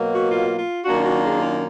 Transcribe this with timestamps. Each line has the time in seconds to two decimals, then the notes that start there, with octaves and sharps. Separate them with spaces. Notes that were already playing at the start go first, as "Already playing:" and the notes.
Already playing: B2 F#3 A#3
0.12 F#4
0.30 F4
0.58 F4
0.85 F#2 D#3 A#3 D4 F4 F#4
1.05 F#4
1.23 G#4
1.42 A#4